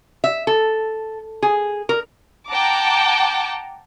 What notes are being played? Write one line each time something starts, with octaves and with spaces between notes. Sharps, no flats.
E5
A4
G#4
A#4
F#5 G5 A5 A#5 D6